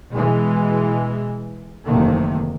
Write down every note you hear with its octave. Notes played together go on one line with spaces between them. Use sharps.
B2 E3 G#3
F#1 E2 C3 D#3 A3 A#3